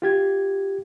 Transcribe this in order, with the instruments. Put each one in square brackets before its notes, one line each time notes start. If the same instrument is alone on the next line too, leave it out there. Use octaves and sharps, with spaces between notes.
[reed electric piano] F4 G4 G#6